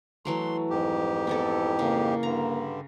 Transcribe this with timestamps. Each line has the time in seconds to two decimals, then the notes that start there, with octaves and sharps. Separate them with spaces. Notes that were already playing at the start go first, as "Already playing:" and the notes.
0.25 E3 F#3 A3 C6
0.70 F2 G#2 G4
1.27 B3 E4 A4
1.79 C#3 A#3
2.23 G2 D3 A#5